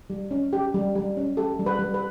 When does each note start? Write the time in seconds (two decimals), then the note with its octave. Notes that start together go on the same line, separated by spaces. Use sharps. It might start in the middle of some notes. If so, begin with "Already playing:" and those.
0.10 G3
0.31 C#4
0.53 G4
0.74 G3
0.95 G3
1.17 C#4
1.37 G4 A4
1.59 G3
1.66 B4
1.79 G3
1.94 B4